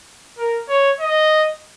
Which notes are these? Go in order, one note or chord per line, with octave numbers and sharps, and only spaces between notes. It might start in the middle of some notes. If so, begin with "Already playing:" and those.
A#4
C#5
D#5